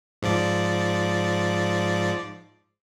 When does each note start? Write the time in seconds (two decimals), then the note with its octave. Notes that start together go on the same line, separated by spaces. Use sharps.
0.22 G#2 F3 D5